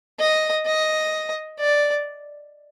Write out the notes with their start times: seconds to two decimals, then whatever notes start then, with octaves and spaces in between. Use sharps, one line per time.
0.19 D#5
0.66 D#5
1.59 D5